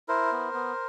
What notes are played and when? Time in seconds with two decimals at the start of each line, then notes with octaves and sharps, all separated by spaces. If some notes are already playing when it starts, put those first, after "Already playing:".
0.08 E4 A#4 C5
0.32 B3
0.54 B3